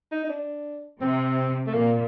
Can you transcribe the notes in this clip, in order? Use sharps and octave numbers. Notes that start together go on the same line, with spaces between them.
D#4
D#4
D4
C3 C4
A3
A#2 A#3